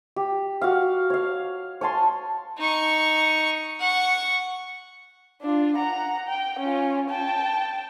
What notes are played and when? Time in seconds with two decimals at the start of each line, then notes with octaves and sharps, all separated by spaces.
0.16 G4
0.62 F#4 F5
1.10 C#5 F5
1.81 C#5 G#5 A5 C6
2.58 D#4 C#6
3.80 F#5 C#6
5.42 D4 F4
5.76 F#5 A#5
6.28 G5
6.59 C#4 F4
7.09 G5 A5